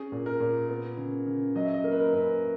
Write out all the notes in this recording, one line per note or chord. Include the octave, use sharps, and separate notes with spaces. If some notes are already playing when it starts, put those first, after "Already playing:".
Already playing: C#4 G#4
A#2
A#4
A#2
B3
C#3
C#3
F#3 D#5
E5
D#5
A#3 A#4
B4
A#4
F#2 B4